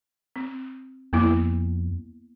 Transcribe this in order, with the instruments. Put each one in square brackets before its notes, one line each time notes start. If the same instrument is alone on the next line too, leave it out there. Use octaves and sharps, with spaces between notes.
[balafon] C4
[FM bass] F2 [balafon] A#3 B3 E4